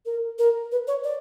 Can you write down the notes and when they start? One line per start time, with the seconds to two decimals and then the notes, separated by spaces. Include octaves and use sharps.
0.06 A#4
0.39 A#4
0.72 B4
0.88 C#5
1.04 D5